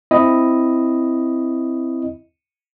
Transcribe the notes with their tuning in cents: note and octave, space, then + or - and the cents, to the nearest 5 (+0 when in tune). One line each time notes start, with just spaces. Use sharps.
C4 +0 E4 +0 D#5 +0